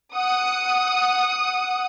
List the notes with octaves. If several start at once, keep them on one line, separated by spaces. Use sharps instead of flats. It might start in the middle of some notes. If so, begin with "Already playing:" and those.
F#5 D#6